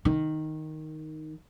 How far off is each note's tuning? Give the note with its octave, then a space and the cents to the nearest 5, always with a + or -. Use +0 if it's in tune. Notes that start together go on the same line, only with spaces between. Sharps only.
D#3 +0 D#4 +0